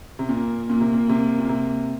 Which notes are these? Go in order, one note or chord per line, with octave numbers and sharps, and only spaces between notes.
C3
A#2 A#3
A#2 A#3
C3
A#2
C3
A#2
C3